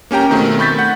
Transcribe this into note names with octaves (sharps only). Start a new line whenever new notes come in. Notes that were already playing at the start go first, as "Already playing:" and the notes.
A#3 C#4 G4 G5 A#5
B2 D#3 A3 C4
B5 C#6 G6 A6 B6
F#5